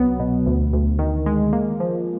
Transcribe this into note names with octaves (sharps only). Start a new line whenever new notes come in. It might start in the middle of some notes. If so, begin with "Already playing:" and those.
Already playing: C2 F#3 B3
B2
D2
D2
D#3
G#3
A#3
F3